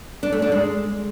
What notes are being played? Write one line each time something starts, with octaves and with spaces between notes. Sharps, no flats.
D4
A3
D4
G#3